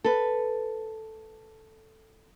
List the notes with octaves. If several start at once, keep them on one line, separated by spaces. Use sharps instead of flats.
A4 B4